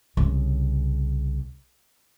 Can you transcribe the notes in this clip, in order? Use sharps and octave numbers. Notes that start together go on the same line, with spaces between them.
C2 C#3